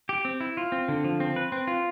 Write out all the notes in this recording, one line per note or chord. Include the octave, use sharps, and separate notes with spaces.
G4
C4
E4
F4
C4
D3
F3
C4
B4
C4
F4